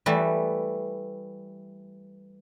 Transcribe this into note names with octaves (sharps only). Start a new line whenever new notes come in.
E3 G3 A3